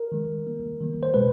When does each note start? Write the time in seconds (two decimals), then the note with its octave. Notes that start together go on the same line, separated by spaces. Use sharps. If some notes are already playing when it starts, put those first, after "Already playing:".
Already playing: A#4
0.12 D#3 G#3
0.46 D#3 G3 A#3
0.80 D#3 G3 A#3
1.03 C5
1.14 B2 G#3 B4